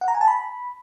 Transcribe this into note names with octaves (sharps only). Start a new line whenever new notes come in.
F#5
A#5
G#5
A5
B5